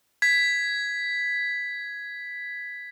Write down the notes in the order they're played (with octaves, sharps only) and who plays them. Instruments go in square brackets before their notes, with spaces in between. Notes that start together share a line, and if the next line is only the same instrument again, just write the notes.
[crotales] G#6 B6